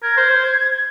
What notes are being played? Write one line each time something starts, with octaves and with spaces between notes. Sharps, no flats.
A#4 G#6
C5
C5